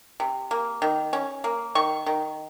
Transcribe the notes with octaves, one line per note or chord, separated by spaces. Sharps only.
C3
A#3
D#3
C#4
A#3
D#3 C#6
D#3